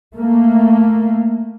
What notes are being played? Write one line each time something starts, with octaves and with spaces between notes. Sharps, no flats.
A3 A#3